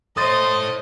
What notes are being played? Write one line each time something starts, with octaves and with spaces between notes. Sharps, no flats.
A4 C5 C#5 D#5 C6 D#6 A6